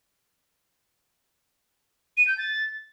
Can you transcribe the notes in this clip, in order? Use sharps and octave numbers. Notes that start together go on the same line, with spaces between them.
D#7
G6
A6